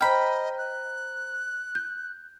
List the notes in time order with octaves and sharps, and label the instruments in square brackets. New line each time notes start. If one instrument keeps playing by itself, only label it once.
[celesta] C5 A#5 F6 [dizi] D#5 [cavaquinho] G5 B5
[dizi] F#6
[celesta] G6